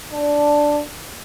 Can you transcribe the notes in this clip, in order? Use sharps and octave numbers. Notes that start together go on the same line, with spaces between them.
D4